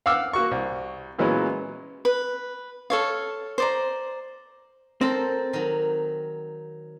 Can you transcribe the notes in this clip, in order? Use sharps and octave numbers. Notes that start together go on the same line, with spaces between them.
F5 F#5 D6 E6 F6
A#3 F#4 C#6
C2
A#2 E3 F#3 G#3 B3 C#4
B4
A4 C#5 F5
C5 D5 A#5
C4 A4 A#4 C5
D#3 F#3